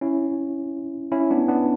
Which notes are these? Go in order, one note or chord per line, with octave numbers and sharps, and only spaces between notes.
C#4 E4
C#4 E4
B3 D4
B3 D4